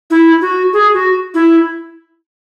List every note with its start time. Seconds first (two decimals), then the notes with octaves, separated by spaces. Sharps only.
0.10 E4
0.41 F#4
0.73 G#4
0.94 F#4
1.34 E4